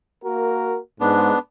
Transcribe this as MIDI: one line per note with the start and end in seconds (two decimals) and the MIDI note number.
0.25 0.78 58
0.25 0.78 66
0.25 0.78 70
1.01 1.32 44
1.01 1.39 59
1.01 1.39 62